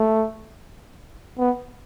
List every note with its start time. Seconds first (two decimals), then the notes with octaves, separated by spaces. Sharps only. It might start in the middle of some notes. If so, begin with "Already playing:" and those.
Already playing: A3
1.38 B3